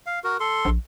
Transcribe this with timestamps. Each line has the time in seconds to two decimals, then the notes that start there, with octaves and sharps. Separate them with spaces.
0.06 F5
0.24 F#4 A#4
0.40 A4 C6
0.65 A#1